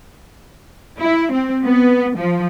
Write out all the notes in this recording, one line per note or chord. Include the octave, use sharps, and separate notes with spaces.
E4
C4
B3
F3